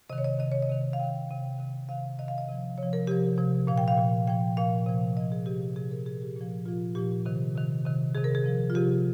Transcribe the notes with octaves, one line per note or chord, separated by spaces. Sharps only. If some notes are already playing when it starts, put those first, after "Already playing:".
C3 D#3 D#5
C#5
D#5
C3 D#3 D#5
C#5
D#5
C3 D#3
F5
C3 D#3 G5
C3 D#3 G5
C3 D#3
C3 D#3 F5
C3 D#3 D#5
F5
D#5
C3 F3
C3 F3 C#5
A#4
C3 F3 G4
C3 F3
A#2 F3 F5
G5
F5
A#2 F3
A#2 F3 G5
A#2 F3 F5
C3 F3
C3 F3 D#5
G#4
C3 F3 G4
C3 F3 G#4
A#4
A#2 F3 G#4
G4
A#2 F3
A#2 F3 F4
A#2 F3 G4
C3 D#3
C3 D#3
C3 D#3
C3 D#3 G#4
A#4
G#4
C3 F3
F4
C3 F3 G4